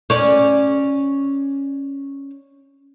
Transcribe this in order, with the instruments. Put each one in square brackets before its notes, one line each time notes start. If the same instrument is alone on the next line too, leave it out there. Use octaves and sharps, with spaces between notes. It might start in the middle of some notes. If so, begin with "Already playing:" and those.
[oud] C#4 D5